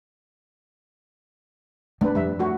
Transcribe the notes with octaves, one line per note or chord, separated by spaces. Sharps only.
B3 C4 D4 B4
F2 G3 E5
A3 F#4